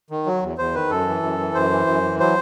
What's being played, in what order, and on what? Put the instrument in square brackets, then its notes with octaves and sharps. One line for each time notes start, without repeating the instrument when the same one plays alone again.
[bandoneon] D#3
F#3
E2
E2 C5
D#3 B4
F#2 A4
E3
F#2
E3
F#2 C5
E3
F#2
E3
F#3 C5